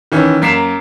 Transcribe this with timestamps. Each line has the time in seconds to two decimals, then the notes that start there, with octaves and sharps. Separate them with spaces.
0.12 D#3 E3 C#4
0.42 F#2 A#3 B6 C7 E7